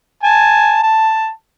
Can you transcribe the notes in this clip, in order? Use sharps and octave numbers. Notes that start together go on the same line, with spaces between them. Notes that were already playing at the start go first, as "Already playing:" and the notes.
G#5 A5
A5